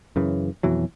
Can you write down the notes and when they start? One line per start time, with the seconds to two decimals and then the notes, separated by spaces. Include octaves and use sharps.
0.16 F#2 C#3 E3
0.63 F2 B2 E3 F#3